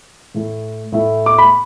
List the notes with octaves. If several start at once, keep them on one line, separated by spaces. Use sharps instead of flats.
A2 A3 E4
A2 A3 E4
D6
B5